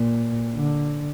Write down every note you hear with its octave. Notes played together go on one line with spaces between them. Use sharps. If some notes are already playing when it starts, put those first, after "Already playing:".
Already playing: A#2
D3